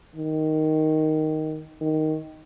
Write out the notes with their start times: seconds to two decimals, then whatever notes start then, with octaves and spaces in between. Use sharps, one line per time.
0.16 D#3
1.81 D#3